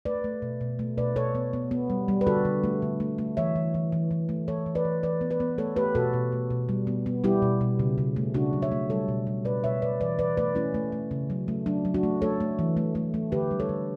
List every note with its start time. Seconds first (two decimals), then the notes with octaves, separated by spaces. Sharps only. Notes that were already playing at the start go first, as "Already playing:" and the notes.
0.05 A3 B4 D5
0.24 A3
0.42 B2
0.61 B2
0.79 A3
0.98 B2 B4 D5
1.16 B2 A4 C#5
1.35 B3
1.53 B3
1.71 B3
1.90 G3
2.08 G3
2.21 B4
2.27 D3 F#4 A4
2.45 D3
2.64 A3
2.82 D3
3.00 A3
3.18 A3
3.37 E3 C#5 E5
3.56 E3
3.74 E3
3.92 E3
4.11 E3
4.29 A3
4.48 E3 A4 C#5
4.66 E3
4.75 B4 D5
4.85 E3
5.03 E3 B4 D5
5.21 B3
5.31 B4 D5
5.40 B3
5.58 A3 A4 C#5
5.76 A3 G4 B4
5.95 B2 F#4 A4
6.13 B2
6.32 A3
6.50 B2
6.69 G3
6.87 B3
7.06 B3
7.24 G3 E4 G4
7.42 B2
7.61 B2
7.79 C#3
7.98 C#3
8.16 A3
8.34 C#3 D4 F#4
8.53 F#3
8.62 C#5 E5
8.72 A3
8.90 G3 A4 C#5
9.08 B2
9.27 G3
9.45 B2 B4 D5
9.64 B2 C#5 E5
9.82 B2 B4 D5
10.01 E3 B4 D5
10.19 E3 B4 D5
10.37 A3 B4 D5
10.55 A3 C#4 E4
10.74 A3
10.92 A3
11.11 C#3
11.30 F#3
11.48 A3
11.66 F#3 D4
11.85 F#3
11.94 D4 F#4
12.03 A3
12.22 A3 A4 C#5
12.40 A3
12.59 E3
12.77 A3
12.95 A3
13.14 A3
13.32 D3 G4 B4
13.51 G3
13.60 A4 C#5
13.69 D3